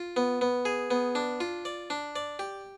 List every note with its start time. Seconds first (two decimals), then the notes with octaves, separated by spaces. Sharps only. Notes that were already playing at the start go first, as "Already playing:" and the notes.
Already playing: F4
0.16 B3
0.41 B3
0.65 G#4
0.91 B3
1.15 D4
1.40 F4
1.65 D5
1.90 D4
2.16 D5
2.39 G4